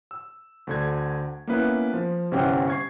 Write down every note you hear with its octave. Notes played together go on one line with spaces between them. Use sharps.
E6
D2 D3 G#6
A#3 B3 C#4 E4 B4
F3
G1 C3 E3 C#4 F#5 G5
C#6 G#6 C7